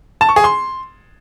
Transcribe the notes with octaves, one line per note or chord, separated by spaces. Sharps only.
A5
C#6
G#4
C6